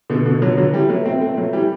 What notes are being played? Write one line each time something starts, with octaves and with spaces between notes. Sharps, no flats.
B2 D3
B2 D3
D3 F#3
D3 F#3
E3 G3
F#3 A3
A3 C4
A3 C4
F#3 A3
E3 G3